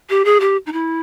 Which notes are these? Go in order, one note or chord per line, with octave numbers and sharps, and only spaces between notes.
G4
G#4
G4
D#4
E4